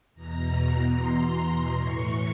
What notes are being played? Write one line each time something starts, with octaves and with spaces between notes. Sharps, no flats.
E2 B2 A#5
A#5
C6
C6
A2 E3 C#6